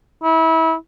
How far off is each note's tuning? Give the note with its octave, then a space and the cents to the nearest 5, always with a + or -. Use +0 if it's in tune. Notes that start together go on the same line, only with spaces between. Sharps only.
E4 -30